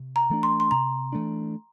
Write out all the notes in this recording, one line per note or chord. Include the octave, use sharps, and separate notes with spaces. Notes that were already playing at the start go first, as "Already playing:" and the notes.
Already playing: C3
A#5
E3 A3 D4
C6
C6
C3 A#5
E3 A3 D4